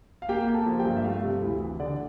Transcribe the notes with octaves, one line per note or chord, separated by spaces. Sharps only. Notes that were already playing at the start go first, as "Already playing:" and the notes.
F5
A#3 G4 G5
A#3
A4 A5
F3
G4 G5
G2
E5
A3 F4 F5
C3
D2 E4 E5
E3
D3 D5